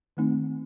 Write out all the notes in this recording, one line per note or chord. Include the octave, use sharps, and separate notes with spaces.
D#3 A3 C4 D#4